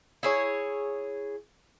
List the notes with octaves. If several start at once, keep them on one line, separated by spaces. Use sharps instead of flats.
E4 G#4 C#5